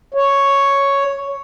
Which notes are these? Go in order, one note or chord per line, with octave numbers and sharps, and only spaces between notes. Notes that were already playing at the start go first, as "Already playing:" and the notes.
C#5